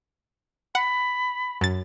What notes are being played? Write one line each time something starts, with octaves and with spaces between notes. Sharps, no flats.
F#5 B5
F#2 A6